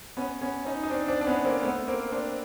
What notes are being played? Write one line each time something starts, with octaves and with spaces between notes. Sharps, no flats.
B3 C#4
B3 C#4
C#4 D#4
D#4
C4 D4
C4 D4
D4
B3 C#4
A#3 C4
A3 B3
A#3 C4
C4 D4